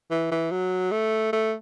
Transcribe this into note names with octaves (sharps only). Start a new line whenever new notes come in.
E3
E3
F#3
A3
A3